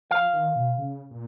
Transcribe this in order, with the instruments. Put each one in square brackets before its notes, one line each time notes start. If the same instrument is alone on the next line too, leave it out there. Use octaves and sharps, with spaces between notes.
[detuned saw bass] F3 [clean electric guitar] F5
[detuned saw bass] D#3
B2
C#3
A#2